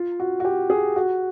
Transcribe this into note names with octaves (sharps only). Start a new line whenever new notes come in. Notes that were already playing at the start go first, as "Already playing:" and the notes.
Already playing: F4
F#4
F#4
G4
G#4
F#4